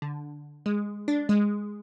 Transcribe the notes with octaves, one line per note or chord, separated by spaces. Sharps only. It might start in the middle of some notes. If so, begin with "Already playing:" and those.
D3
G#3
D4
G#3